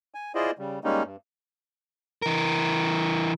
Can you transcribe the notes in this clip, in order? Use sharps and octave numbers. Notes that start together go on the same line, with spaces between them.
G#5
E4 F4 G#4 C5 D5 D#5
C#3 G3
G3 G#3 A#3 C#4 D#4
G2
E3 A#4